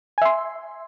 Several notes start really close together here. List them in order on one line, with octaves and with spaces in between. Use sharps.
G#5 E5 C6